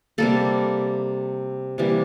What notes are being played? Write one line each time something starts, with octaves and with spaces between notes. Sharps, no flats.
C3 G3 A#3 A4
C3 E3 G3 A#3